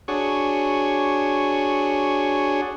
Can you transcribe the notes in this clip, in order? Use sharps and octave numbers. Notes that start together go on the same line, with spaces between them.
D4 F#4 G#4 C#5